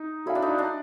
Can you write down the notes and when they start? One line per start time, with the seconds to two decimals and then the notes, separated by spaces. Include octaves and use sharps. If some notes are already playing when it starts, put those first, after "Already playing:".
Already playing: D#4
0.26 E4 F#4 A4 D5 F5 G#5
0.35 D4
0.42 D#4
0.58 D4